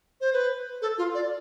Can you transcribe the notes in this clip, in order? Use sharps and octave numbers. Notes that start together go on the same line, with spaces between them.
C5
B4
A4
F4
D5